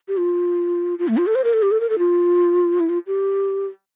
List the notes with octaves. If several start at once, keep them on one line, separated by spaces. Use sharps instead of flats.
G4
F4
F4
A3
F4
A4
C5
A#4
A4
G4
A4
A#4
A4
F4
E4
F4
G4